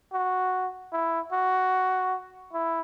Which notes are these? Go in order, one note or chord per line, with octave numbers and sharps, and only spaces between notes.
F#4
E4
F#4
E4